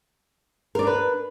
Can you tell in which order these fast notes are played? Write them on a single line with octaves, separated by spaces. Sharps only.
A#4 D5 D4 B4